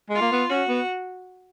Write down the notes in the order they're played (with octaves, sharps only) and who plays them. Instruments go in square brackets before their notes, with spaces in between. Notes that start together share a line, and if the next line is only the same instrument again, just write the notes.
[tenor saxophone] G#3
[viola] F4
[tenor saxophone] A#3
B3
[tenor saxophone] C#4 [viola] F#4
[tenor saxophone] B3